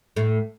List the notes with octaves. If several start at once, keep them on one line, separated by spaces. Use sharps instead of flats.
A2 A3